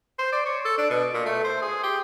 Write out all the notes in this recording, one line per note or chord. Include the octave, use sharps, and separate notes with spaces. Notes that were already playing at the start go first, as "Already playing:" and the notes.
C5
D5
C#5
A4
D4
B2
A#2
A3
C5
G#4
G4